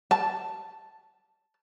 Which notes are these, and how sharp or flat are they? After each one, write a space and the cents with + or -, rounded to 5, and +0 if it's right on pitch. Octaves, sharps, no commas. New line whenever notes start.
A5 +0